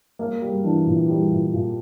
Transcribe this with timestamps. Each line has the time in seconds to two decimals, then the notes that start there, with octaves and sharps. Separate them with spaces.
0.19 A#3
0.42 G3
0.64 E3 D4
0.86 A#2
1.09 G3
1.31 A#2
1.53 A#2